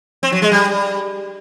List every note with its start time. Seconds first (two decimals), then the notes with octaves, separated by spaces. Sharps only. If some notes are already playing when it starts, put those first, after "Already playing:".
0.23 C4
0.32 F#3
0.42 G#3
0.52 G3